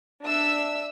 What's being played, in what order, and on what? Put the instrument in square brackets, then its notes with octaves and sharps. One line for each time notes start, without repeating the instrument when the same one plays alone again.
[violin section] D4 E5 E6